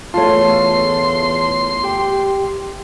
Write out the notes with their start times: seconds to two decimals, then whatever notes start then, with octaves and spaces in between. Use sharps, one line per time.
0.14 E2 A3 F4 C#5 A5 C6
1.84 G4 G5